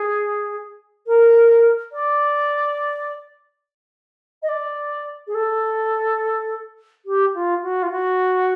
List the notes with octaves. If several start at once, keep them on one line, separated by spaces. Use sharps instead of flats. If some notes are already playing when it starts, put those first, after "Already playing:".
Already playing: G#4
A#4
D5
D#5
D5
G#4
A4
G4
F4
F#4
F4
F#4